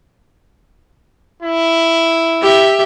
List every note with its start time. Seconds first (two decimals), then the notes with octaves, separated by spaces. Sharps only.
1.43 E4
2.42 G4 E5